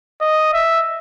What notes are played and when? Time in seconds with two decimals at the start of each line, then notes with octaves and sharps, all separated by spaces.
0.21 D#5
0.53 E5